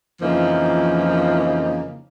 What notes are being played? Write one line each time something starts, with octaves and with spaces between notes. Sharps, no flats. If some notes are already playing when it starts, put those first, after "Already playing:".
F2 C#3 E3 F3 A#3 D#4